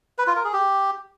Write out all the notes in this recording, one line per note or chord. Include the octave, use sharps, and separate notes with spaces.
B4
F4
A#4
G#4
G4